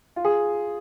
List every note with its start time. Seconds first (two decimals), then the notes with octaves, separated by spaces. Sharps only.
0.16 F4
0.25 G#4